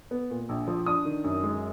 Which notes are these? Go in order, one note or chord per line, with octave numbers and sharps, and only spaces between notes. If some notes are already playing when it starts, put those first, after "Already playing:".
B3
A#2
A#1
F3
D4 D#6
D#3
F#2
G#3